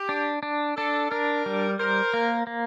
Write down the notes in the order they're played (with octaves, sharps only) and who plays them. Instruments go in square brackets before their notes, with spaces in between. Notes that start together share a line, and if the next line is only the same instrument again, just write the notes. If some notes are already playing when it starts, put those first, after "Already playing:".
Already playing: [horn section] G4
[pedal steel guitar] D4
D4
[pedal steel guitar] D4 [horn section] A4
[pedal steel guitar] D4 [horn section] A#4
[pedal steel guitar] G3
[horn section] A#4 [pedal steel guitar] C5
[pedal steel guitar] A#3
A#3